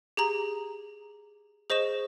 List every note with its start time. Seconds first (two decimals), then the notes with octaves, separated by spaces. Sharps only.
0.17 G4 G#4 A#5 F#7
1.70 G#4 C5 D#5 C#6 E7